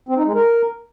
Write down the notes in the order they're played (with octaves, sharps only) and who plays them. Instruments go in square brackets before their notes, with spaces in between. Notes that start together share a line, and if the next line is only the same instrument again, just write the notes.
[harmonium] C4
D#4
G#3
A#4